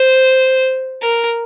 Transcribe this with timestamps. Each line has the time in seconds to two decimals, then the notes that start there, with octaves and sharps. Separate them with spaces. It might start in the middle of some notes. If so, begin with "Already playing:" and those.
Already playing: C5
1.02 A#4